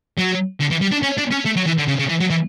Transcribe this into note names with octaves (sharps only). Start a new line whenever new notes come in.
F#3
D3
E3
G3
D4
C#4
D4
C#4
A3
F#3
E3
D3
C#3
C#3
E3
F#3
E3